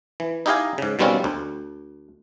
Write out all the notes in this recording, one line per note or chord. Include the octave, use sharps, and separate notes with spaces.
E3
D#4 E4 G4 D#5 F5 G#5
G#2 C#3
B2 D#3 G3 C4 C#4 F4
D2